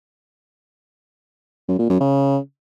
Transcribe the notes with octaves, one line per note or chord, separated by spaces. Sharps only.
F#2
A#2
F#2
C#3